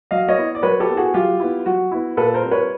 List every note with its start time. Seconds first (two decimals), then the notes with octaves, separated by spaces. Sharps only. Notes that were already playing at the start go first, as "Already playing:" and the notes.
0.11 F#3 D#5 F5
0.28 C#5 D#5
0.37 B3 E4
0.55 D5
0.62 F#3 B4 C#5
0.80 G4 A4
0.89 B3 E4
0.97 F#4 G#4
1.14 F#3 F4 G4
1.40 B3 E4
1.66 F#3 F#4
1.91 B3 E4
2.17 A#2 A4 B4
2.34 A#4 C5
2.43 G3 C4 F4
2.51 B4 C#5